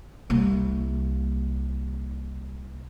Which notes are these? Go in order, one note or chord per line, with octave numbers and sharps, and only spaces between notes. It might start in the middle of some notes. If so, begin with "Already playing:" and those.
C2 A#3